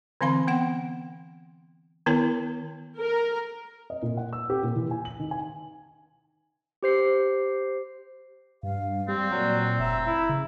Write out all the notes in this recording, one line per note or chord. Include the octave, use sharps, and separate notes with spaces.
D3 E3 C4 F5 B5 C6
B3 F#5 G5
D#3 B3 E4 A#4 C#5 A5
A#4
D#5
A#2
F#5
E6
G4
A#2
E3
G#5
F#7
D#3
G#5
G4 C5 C7
G2 F5
G3 C4
A#2 F#3 D5
F1 E5 A#5
E4
C#3